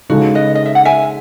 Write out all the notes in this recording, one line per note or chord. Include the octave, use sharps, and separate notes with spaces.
C#3 G#3 D#4 F#4 A4
B4 D#5
D#5
E5
F#5
E5 G#5